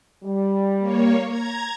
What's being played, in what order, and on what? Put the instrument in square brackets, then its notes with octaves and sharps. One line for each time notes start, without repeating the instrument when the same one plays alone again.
[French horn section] G3
[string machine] A#3 C#5
A#5 G#6